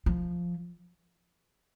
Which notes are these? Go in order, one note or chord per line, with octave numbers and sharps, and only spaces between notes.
F3